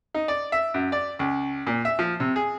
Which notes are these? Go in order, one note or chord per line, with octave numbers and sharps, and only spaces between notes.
D#4
D5
E5
F#2
D5
C#2
A#2
E5
F3
C3
G#4